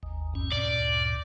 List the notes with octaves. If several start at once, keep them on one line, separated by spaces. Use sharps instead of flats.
G#1 D#2
E2 G2 C#4
D2 G2 A#2 D5